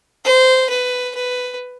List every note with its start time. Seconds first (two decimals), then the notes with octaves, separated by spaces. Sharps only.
0.25 C5
0.70 B4
1.15 B4